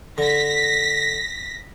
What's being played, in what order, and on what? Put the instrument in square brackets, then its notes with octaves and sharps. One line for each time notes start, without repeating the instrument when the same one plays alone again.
[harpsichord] D3 [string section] A#6 B6